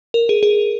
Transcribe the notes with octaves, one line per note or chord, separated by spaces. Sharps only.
A#4
G#4
G#4